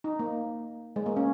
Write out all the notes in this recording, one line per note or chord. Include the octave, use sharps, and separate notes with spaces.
D#4
A#3
G#3
A#3
C#4